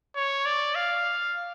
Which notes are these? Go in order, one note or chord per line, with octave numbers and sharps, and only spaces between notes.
C#5
D5
F5